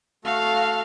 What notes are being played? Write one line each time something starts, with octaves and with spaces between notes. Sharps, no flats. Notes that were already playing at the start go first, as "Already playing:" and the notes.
A3 F#4 A4 F5